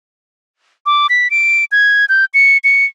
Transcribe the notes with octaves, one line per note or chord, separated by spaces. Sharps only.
D6
B6
D7
G#6
G6
C#7
C#7